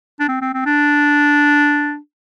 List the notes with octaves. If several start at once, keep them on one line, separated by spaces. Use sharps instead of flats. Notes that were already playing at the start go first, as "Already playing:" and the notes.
D4
C4
C4
C4
D4